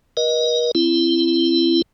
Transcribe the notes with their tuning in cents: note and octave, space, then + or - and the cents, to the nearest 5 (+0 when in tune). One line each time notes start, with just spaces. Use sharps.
A#4 +45 D#5 +0
C4 +0 E4 +25